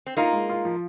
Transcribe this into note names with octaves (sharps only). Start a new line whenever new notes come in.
C4
A#3 D#4 F4
G#3
F4
F3